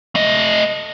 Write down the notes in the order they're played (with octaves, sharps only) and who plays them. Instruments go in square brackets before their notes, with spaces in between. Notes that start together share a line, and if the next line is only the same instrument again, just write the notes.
[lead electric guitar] A3 D#5